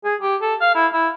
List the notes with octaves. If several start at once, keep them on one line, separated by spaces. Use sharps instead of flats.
G#4
G4
A4
F5
E4
E4